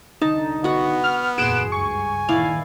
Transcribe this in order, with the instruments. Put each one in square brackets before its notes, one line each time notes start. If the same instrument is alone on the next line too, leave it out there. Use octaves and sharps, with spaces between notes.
[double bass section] C2 D3 [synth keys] D#4 [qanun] A5
[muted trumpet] B3 [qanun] F#4 F#5
[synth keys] F6
[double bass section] F#1 E2 A#2 [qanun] G#4 C6 [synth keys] F#6 D7 E7
[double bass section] C#2 G2 [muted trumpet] G#5 [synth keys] C#6
[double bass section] A#2 D#3 E3 [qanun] E4 D5 F5